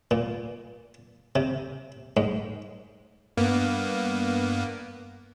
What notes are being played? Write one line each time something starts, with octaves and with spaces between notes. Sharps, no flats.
A#2
C3
G#2
G2 A#3 B3